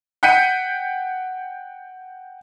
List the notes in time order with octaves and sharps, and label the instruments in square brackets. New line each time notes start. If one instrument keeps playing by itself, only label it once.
[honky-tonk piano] F#5 G5 G6 B6 C#7 D#7